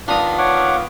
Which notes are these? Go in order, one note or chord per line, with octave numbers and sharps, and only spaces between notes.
D#3 B3 D4 F4 A#5 D#6
C#5 F#5 D6